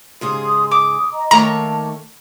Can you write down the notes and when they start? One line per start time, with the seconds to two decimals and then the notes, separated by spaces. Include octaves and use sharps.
0.21 G#2 C#3 G4 G#4 C6 D#6
0.71 D6 D#6
1.12 D#5 A#5
1.31 D#3 A3 A#3 C#5 G5 A5 A#5